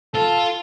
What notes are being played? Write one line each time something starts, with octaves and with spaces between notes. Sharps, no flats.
F4 A4